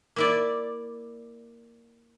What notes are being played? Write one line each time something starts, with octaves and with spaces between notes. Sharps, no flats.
A#3 E4 D5